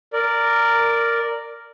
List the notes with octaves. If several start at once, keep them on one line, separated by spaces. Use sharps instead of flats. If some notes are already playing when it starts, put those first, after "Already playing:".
A#4 D5